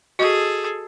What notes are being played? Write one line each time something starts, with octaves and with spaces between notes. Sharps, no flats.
F#4 G#4 A4 D#5